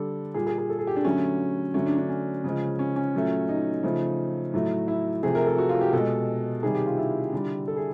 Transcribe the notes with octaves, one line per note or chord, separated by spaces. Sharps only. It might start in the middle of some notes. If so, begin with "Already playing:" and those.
Already playing: D3 G3 A4
A#2 G3 G#4
G#4
G#4
A4
G#4
G4
D4
D3 F#3 A3 C#4
D3 F#3 A3 C#4
D4
D4
C#4
C#3 F3 G#3
C#4
C#4
A#2 F#3 A3
D#4
C#3 F3 A3
A2 F#3 A3
E4
C3 F3 A3 G#4
A#4
A4
F#4
F4
G4
B2 G#3 A4
C3 D#3 G3 G#4
G4
F4
E4
D3 G3
A4
G#4